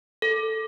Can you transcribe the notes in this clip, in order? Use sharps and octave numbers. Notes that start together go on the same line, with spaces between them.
A4